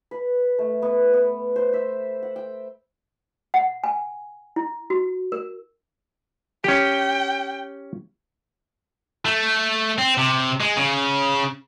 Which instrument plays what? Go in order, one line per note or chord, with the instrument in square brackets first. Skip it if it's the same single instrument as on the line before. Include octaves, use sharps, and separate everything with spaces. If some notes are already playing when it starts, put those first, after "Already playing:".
[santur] B4
A3
B3
B3
C5
E5
F#5
G5
[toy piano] F#5
G#5
E4
F#4
A#4
[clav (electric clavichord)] C#4 G4 [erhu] G5
[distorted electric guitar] A3
C4
C3
G#3
C#3